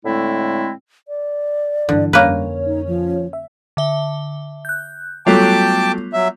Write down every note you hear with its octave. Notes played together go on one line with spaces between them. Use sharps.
A2 D3 G#3 A3 C4 E4
D5
G2 D3 E3
F2 G3 A#3 C#4 B4 C#5
D#4
F3
E5
D3 E5 G7
F#6 G6
F#3 G3 A3 B3 F4 G5 A5 D6
F#3 E5